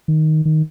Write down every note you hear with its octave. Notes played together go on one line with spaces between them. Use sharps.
D#3
D#3